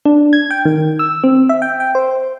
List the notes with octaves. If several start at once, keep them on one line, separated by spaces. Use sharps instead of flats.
D4
G#6
G5
D#3
E6
C4
E5
G5
G5
C5